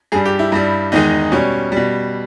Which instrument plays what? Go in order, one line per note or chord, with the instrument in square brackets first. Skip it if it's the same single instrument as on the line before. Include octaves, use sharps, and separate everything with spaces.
[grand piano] G2 G3 G#4
G4
E4
G2 G3 E4
E2 D#3 G#3 D#4
B2 G3 C#4
B2 G3